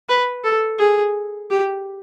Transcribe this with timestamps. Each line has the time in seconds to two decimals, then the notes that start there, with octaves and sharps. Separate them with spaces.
0.09 B4
0.44 A4
0.79 G#4
1.50 G4